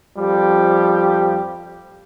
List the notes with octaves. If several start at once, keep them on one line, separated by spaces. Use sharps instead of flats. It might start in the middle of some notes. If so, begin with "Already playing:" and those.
F2 F3 G3 G4